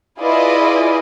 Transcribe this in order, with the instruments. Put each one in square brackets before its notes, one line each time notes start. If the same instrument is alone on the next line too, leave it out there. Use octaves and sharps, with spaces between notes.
[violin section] E4 F4 G#4 B4 D5 D#5